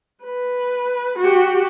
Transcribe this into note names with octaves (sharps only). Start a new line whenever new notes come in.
B4
F#4 G4